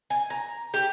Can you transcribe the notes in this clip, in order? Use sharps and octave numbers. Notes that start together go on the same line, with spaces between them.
G#5
A#5
G4